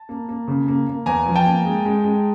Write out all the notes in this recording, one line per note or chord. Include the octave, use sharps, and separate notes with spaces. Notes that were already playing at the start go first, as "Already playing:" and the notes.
Already playing: A5
A#3
A#3
C#3
A#3
A#3
E2 G#5 A#5
F3
G5 A5
A#3
G#3
G#3
G#3